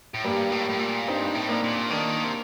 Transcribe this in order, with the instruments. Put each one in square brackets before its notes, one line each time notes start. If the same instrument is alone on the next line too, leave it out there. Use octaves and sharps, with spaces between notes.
[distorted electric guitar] A2
[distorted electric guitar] G2 [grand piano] G3 A#3
[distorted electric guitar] A2
A2
A#2
[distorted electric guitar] G2 [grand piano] C4 D#4
[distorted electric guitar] A2
[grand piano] A#3 D4
[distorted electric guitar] A#2
[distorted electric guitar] D#3 [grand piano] A#3 D4
[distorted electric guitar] C3